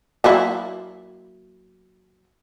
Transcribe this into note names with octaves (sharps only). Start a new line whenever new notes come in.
F#3 A#3 E4